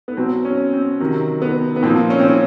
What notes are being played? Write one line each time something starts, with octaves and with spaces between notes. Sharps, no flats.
B3
B2 F#3 C4
C#4
C4
C3 D#3 F#3
B3
B3
A#2 F3 C4
C#4
C4
C#4